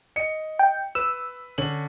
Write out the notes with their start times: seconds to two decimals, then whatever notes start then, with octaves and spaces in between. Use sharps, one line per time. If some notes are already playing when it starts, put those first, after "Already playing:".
0.16 D#5 C#7
0.59 G5
0.95 B4 E6
1.58 D3 C#4 F#7